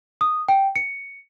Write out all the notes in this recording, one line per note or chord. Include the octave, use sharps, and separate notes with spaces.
D#6
G5
C#7